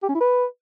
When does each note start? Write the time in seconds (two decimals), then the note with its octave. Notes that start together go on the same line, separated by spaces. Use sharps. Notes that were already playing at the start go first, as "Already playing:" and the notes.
0.03 G4
0.09 C#4
0.15 E4
0.21 B4